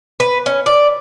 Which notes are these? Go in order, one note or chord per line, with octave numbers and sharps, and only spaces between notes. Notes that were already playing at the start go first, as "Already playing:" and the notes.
B4
C#4
D5